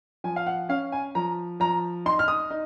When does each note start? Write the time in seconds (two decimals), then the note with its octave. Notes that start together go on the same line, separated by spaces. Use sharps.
0.24 F3 G#5
0.36 F5
0.47 F#5
0.69 C#4 F5
0.92 G#5
1.15 F3 A#5
1.60 F3 A#5
2.06 D#4 C6
2.19 F6
2.28 D#6
2.51 D#4